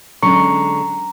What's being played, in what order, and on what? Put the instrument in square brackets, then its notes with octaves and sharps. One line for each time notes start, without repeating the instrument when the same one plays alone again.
[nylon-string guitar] D3 G#3 [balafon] F#3 C#4 D4 [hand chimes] A#5 [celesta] C#6 C#7